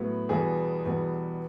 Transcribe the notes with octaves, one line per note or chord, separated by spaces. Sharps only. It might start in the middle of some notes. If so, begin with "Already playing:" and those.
Already playing: A2 F#3 B3
E2 B2 G3 B3 G#4
E2 B2 G3 B3